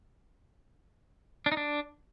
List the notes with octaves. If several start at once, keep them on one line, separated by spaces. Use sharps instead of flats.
D4
D#4
D4